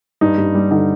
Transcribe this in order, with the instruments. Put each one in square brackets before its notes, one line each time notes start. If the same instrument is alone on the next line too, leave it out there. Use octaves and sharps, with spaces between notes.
[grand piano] G2 D#4
G2
G3
D3 D#4